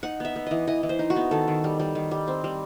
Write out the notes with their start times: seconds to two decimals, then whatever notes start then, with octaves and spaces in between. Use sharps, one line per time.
0.03 D#4 F#5
0.20 B3 E5
0.36 B3
0.47 E3 D#5
0.67 E3 D#5
0.83 E3
0.89 C5
0.99 D#4
1.10 F#4
1.16 B3
1.31 D#3 A4
1.48 D#3
1.64 G3
1.79 G3
1.95 D#3
2.11 G3
2.28 C4
2.44 G3